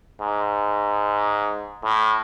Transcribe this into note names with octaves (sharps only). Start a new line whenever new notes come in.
G#2
A2